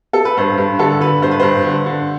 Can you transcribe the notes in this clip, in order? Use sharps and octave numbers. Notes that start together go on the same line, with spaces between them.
A4
B4
G2 C5
G2
D3 A4
D3 B4
G2 C5
B4
G2 C5
D3
D3